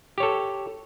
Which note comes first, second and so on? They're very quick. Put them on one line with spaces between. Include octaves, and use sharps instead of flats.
G4 C#5 A4